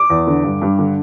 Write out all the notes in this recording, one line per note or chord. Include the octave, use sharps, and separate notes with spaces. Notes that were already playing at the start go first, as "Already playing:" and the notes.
Already playing: D6
E2
D3
G2
G2
D3